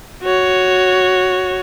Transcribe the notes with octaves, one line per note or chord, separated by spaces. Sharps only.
F#4 C#5